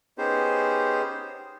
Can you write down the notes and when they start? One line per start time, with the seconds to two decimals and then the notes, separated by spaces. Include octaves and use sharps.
0.18 B3 C#4 D#4 G4 G#4 C5